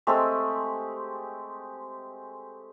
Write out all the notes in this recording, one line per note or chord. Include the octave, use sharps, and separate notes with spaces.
G#3 A3 C4 G4